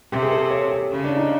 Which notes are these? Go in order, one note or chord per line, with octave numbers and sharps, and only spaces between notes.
C3 G4
G#4
A4
C#5
G4
C#3
D4
D#4